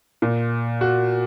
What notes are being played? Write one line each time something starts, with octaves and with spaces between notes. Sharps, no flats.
A#2
F#4